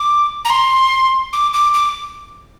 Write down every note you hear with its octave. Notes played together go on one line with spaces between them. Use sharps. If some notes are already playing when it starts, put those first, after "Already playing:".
Already playing: D6
A#5
C6
D6
D6
D6